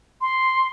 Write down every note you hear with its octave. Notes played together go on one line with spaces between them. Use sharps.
C6